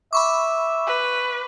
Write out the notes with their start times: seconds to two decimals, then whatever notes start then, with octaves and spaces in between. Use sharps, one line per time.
0.13 E5 B5 C#6 D6
0.87 B4